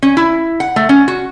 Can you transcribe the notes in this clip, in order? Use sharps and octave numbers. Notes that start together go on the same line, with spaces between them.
C#4
E4
F#5
A3
C#4
F#4